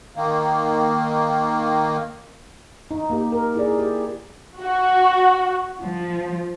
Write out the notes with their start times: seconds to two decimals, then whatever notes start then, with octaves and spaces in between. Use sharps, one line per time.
0.16 D#3 A#3
2.91 D#4
3.10 A#3 G4
3.32 A#4
3.55 E4 G#4 D5
3.78 G4
4.61 F#4
5.81 F3